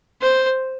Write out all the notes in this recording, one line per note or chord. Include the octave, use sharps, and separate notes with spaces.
C5